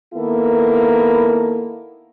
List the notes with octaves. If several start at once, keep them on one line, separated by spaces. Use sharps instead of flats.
D#3 A#3 B3 E4 A4